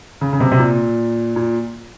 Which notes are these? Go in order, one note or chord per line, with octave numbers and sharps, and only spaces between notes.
C#3
C#3
C3
C3
A#2
A#2